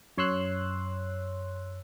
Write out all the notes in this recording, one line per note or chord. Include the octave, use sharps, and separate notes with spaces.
F#2 C#5 C6 E6 F#6